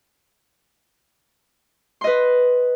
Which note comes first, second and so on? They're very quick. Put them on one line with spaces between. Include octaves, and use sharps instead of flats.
C6 D#5 B4